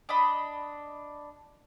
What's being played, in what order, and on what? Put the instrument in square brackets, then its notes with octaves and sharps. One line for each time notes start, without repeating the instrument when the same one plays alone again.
[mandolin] D4 D#5 B5